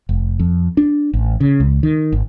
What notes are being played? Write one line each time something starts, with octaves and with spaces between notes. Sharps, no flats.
F1
F2
D4
A1
C#3
C#2
D#3
G#1